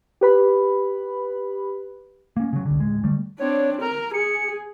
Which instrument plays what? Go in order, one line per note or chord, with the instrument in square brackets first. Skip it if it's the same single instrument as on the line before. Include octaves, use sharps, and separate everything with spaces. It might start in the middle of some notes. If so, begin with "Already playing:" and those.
[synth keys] G4 B4 B5
[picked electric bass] A#3 C#4
C#3 F#3
C2 D3
D1 G#3
D3 G3 A3
[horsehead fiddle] C4 D4 [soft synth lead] C#5
[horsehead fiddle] A#4 [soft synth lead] A#5
[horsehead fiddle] G#4 [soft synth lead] C#7